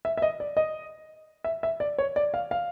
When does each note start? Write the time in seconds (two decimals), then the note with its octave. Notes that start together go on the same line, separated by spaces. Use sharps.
0.05 E5
0.17 E5
0.22 D#5
0.40 D5
0.57 D#5
1.44 E5
1.63 E5
1.80 D5
1.98 C#5
2.16 D5
2.34 F5
2.51 F5